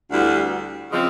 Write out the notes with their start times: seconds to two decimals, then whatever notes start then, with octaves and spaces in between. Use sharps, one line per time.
0.11 D2 D3 G3 B3 E4
0.92 C#3 F3 G#3 C4